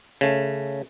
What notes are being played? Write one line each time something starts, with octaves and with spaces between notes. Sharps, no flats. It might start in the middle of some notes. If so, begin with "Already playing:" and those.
C#3 A3